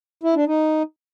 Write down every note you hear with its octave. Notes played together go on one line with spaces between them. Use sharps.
E4
D4
D#4